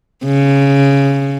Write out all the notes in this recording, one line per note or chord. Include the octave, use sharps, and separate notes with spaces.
C#3